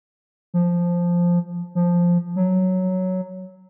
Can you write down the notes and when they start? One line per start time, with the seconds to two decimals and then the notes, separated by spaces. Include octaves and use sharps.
0.54 F3
1.75 F3
2.36 F#3